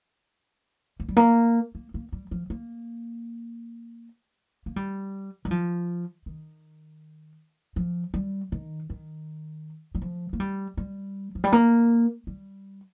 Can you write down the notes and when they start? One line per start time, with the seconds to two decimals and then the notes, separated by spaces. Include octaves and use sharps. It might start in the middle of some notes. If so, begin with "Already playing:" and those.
1.00 A#3
1.09 G3
1.17 A#3
1.75 A#3
1.94 A#3
2.12 G3
2.31 F3
2.50 A#3
4.66 A#3
4.76 G3
5.45 G3
5.51 F3
6.26 D#3
7.76 F3
8.14 G3
8.52 D#3
8.90 D#3
9.95 G3
10.02 F3
10.33 A#3
10.40 G3
10.77 G3
11.35 F3
11.44 G3
11.52 A#3
12.27 G3